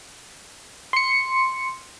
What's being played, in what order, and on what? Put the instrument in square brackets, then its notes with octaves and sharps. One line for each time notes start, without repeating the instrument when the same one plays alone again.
[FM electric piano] C6 C#7